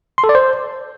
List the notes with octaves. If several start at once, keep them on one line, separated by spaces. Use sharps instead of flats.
C6
A4
D5
C5